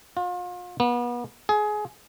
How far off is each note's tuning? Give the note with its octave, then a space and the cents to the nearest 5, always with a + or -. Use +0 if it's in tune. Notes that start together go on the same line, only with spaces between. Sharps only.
F4 +35
B3 -35
G#4 +20